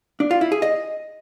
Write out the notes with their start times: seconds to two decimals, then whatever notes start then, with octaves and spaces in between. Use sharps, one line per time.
0.20 D4
0.31 F4
0.41 E4
0.52 G#4
0.62 D#5